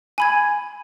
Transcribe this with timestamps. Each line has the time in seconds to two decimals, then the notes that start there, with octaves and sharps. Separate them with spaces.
0.18 G#5 B5 G#6